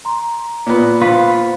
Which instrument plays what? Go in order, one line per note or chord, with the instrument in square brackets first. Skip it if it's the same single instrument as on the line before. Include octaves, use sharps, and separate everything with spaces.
[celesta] A#5 C6
[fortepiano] A#2 B3
[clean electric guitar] F4 B4 [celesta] C5 F5